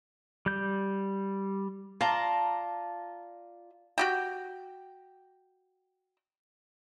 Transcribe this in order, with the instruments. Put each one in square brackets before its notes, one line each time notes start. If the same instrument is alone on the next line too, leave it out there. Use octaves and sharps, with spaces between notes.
[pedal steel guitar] G3 G6
[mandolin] F4 D5 A#5 [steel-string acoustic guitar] A5
[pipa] F#4 G4 G5